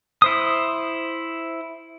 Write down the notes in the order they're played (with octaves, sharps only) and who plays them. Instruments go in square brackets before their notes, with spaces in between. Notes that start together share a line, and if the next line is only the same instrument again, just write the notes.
[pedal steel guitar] E4 C5 D#6